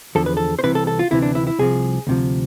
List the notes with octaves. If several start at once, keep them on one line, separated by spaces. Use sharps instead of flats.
E2 D3 F3 A4
B4
A4
C5
C2 C3 E3 B4
A4
A4
F4
D2 C3 E3 E4
D4
E4
E4
C2 C3 F3 G#4
D2 C3 F3